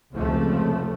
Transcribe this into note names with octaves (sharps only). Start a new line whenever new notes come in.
F1 C#2 C#3 F3 A3